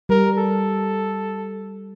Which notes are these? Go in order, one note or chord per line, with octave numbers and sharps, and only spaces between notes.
G3 A#4
A4